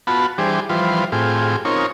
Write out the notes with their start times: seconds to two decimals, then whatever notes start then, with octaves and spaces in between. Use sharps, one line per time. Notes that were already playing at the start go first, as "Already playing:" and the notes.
0.07 B3 F4 F#4 A5 B5
0.38 E3 G3 D4 G4 G#4 C5
0.69 E3 F3 G3 F4 B4 C5
1.12 A2 C4 F4 G4 G#4
1.65 C4 C#4 D#4 F4 A#4 C#5